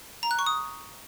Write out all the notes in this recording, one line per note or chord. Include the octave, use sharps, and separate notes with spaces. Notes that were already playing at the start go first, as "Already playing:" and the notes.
A#5
F#6
C#6
D#6